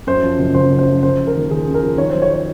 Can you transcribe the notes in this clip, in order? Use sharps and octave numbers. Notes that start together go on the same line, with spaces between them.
F#2 C5
F3
F#1
F#1 C5
F#2
C5
F3
C#3 C5
F3
A#4
D#2
D#2 G#4
C#3
A#4
F3
D#3 C#5
F#3 C5
C#5
C#5